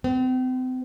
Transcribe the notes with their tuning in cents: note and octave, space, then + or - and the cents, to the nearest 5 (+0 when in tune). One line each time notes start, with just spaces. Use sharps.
C4 -40